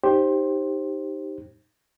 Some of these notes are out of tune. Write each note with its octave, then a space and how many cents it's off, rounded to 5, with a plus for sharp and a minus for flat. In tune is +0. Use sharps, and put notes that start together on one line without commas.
D#4 +0 G4 +0 C5 +15